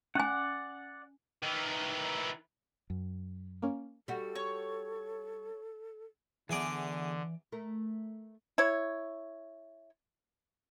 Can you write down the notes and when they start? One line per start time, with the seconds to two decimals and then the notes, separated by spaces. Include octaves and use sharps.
0.15 C#4 D5 F#5 G#5
1.43 D#3 E3
2.90 F#2
3.62 A#3 C#4
4.08 G3 F#4 A4
4.35 C#5
6.49 E2 D3 E3 G#4 D5 A#5
7.52 A3 A#4
8.58 E4 C#5